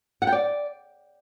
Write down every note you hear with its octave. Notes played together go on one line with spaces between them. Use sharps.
F#5
G5
D5